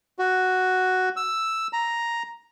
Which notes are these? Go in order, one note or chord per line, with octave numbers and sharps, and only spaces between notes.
F#4
E6
A#5